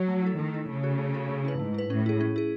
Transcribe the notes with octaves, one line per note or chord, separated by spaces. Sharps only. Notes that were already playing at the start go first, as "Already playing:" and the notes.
Already playing: F#3
A3
E4 A4
D#3 A3
E4 A4
C#3 A3
C#4 F#4 A4
A3
C#4 F#4 A4
A3
E4 B4
G#2 A3
E4 B4
A2 C#4
E4 G#4
C#4
E4 G#4